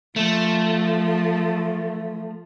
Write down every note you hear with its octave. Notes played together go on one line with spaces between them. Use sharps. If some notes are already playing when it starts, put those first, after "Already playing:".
F3 A3